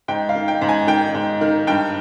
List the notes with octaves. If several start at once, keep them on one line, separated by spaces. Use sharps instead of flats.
G#2 G5
F5
D#3
G5
G#2
G#5
D#3 G5
G#2
D#3
G2 G5